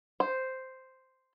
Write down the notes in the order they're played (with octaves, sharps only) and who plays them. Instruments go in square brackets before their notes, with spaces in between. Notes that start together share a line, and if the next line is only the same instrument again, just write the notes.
[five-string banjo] C5